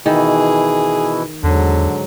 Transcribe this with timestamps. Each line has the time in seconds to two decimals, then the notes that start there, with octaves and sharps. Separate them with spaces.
0.06 B2 D#3 E3 E4 G#4
1.43 E2 G#2 D3 F#3